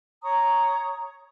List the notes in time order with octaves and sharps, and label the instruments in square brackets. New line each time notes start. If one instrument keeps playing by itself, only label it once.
[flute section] C#5 A#5 C#6 D#6